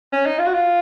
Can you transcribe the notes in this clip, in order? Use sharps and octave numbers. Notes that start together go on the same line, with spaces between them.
C#4
D#4
F4
F#4
F4